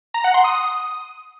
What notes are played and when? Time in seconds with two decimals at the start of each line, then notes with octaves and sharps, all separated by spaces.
0.14 A#5
0.24 F#5
0.34 C6
0.44 D#6